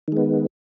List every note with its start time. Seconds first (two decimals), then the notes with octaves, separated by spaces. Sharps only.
0.08 D#3
0.12 G#3
0.17 B3